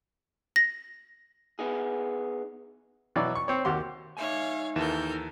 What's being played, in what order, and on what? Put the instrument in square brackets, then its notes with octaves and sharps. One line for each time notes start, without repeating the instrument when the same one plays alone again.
[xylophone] A#6
[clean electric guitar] B3 D#4 G#4
[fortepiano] B2 E3 F#3 D5
C#6
C4 C#5
D#2 F#4 G4 C6
[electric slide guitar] D#4 E5 G#5 [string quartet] C#5 F5
[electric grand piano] D#2 E3 E7 [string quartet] A4 A#4 G6